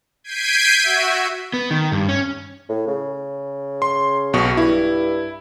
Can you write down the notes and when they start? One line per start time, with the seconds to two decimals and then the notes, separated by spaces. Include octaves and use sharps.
0.24 G6 G#6 B6 C7 D7 D#7
0.80 F#4 E5
1.54 B3
1.71 D#3
1.92 G2
2.09 C#4
2.69 A2
2.87 C#3
3.82 C6
4.33 B1 B2 C#6
4.57 G2 E4